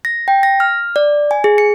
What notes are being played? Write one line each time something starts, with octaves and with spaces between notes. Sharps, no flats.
A#6
G5
A#6
F6
D5
G#5
G#4
C#7